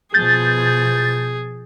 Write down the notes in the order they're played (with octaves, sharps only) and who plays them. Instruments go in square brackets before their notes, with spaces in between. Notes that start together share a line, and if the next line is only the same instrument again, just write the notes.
[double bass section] B2 F3 [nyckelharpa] G#4 [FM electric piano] G6 A6